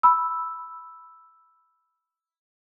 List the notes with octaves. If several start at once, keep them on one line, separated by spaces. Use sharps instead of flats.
B5 E6